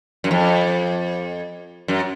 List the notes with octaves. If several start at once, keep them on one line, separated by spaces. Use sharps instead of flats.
F#2
F2
F#2